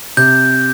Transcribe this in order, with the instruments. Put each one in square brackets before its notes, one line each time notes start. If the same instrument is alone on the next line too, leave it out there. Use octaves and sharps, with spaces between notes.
[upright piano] C3 [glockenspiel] G6